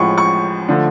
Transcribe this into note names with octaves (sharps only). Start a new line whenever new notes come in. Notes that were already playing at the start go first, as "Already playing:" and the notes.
Already playing: A1 A2 F3 G#3 C#6
C#6
D3 F3 A3